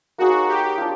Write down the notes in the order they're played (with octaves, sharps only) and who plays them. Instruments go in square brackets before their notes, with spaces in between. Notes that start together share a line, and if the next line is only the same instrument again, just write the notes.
[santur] A#3 D#4 G#4 C#5 [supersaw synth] F#4
[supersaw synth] G4
[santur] D4 F4